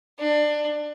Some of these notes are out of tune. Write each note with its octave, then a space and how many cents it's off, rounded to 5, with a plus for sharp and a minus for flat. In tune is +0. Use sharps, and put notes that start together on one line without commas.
D4 +20